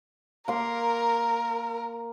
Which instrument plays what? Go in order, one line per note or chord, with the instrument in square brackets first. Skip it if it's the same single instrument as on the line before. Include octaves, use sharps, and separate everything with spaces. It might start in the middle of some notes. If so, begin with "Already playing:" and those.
[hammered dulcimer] A#3 C6 [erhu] A#4